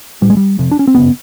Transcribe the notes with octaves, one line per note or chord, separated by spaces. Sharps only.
A#1 A2 G3
G#3
G3
F1 F2 C3
D4
C#4
C4
G1 F#2 C#3 B3